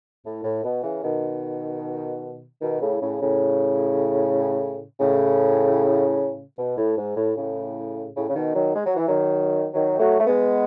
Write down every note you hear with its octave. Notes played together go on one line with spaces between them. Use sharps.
A2
A2
B2
C#3 E3
B2 D#3
B2 D#3
A2 C#3
A2 C#3
A2 C#3
A2 C#3
B2
A2
G#2
A2
A2 C#3
A2 C#3
C#3
B2 D#3
D#3 F#3
G#3
F#3
E3
D#3 F#3
D#3 F#3
F#3 A3
A3
G#3 B3